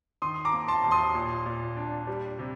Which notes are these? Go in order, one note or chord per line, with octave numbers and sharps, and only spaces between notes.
D#3 C6 D#6
A#5 D6
A#3
A5 C6
D#2
C6 D#6
A#2
A#2
D4
G3
C3